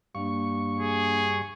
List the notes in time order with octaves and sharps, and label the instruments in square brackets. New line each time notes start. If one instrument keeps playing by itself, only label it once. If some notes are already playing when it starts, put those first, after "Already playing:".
[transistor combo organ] G2 C#6 [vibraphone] A#3 D4 F5
[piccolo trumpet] G#4